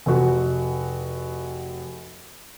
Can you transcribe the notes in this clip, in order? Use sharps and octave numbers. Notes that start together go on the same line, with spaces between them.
F1 F#4